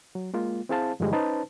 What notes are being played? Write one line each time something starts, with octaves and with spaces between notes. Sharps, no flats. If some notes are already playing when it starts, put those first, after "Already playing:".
F#3
G#3 A#3 F4
C4 E4 G#4 C5 F5 A5
G2 D3 E3 F3 G3 G#3
C#4 D#4 B4 C5 A5